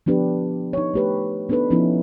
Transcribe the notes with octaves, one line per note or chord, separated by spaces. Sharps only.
F3 B3 D4 G4 B4
D#4 C#5
A3 G4 B4
B3 D4 D#4 A4 B4
F3 B3 C#4 D#4 E4